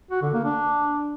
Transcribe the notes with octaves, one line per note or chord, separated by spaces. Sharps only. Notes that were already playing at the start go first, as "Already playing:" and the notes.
F#4
D3
A#3
D4